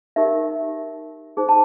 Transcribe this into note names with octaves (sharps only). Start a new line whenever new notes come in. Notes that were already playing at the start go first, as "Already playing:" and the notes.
D#4 G4 A#4 E5
D#4 G#4 C5
A5